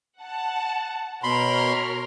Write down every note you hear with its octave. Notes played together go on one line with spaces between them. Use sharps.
F#5 A5
B2 A#4 C#5 B5 C6 F6